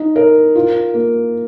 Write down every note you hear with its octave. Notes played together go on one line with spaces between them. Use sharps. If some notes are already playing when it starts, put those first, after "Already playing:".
Already playing: D#4
A#4
F4
A#3